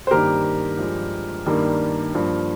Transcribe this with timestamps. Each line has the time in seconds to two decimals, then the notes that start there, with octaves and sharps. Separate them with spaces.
0.07 C5
0.11 G2 D#3 A#3 G4 A#4
0.79 G2 F3 G#3
1.46 G2 D#3 G3 A#3
2.13 G2 F3 A#3